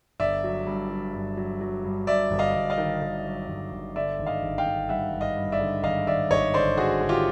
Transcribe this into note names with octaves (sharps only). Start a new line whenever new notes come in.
G1 D5 E5
F#3
G2
F#3
G2
F#3
F#3
G2
G2 D5 E5
G1
D#5 F5
G1
D#5 F5
D#3
D#3
F#3
G1
G1
D3 D5 E5
G#1
D#5 F5
G#1
F5 G5
D3
G2 E5 F#5
G2
D#5 F5
G2
D5 E5
D3
G#1 D#5 F5
G#1 D5 E5
G#1 C#5 D#5
D3 C5 D5
D3 F#4 G#4
D3
F4 G4